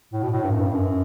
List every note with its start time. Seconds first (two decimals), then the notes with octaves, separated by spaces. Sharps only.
0.13 A2
0.23 B2
0.32 A2
0.44 G2
0.52 F#2
0.61 G2
0.74 F#2